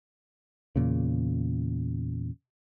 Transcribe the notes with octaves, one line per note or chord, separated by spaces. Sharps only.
E2 A#2 C#3